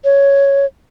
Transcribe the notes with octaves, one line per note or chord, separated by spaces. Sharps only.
C#5